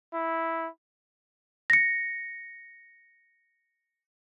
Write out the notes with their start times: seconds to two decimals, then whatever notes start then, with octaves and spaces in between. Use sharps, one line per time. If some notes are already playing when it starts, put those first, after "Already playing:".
0.13 E4
1.70 A#6 C#7